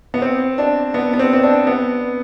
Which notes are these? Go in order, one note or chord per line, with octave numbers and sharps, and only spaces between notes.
B3
C4
D4
B3
B3
C4
C4
D4
B3